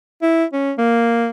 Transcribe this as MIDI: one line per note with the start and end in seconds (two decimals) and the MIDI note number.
0.23 0.45 64
0.53 0.73 61
0.78 1.30 58